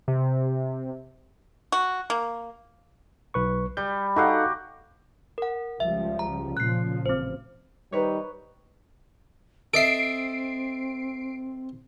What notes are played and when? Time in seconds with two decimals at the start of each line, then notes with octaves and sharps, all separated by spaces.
0.08 C3
1.72 F#4
2.10 A#3
3.34 B1 B4 C#6
3.77 G3 G6
4.16 D#4 F#4 G4 A4 F5 F#5
5.38 A#4 F#5
5.80 C#2 F3 G3 E5
6.19 A#5
6.57 A#2 C#3 F3 F#6 C7
7.06 A1 C4 C5
7.92 D#3 G3 D#4 B4 C#5
9.74 C4 A4 D#5 E5 C7 D7